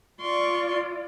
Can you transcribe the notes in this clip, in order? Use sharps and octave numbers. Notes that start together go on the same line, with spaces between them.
F4 D5 C6 C#6